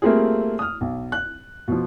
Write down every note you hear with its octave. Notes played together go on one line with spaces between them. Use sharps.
G3 A3 A#3 C4 F4 G#4
D#6 F6
B1
F#6
B2 F3